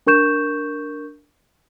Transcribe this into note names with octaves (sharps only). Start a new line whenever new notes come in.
D4 A#4 C#6 G6 E7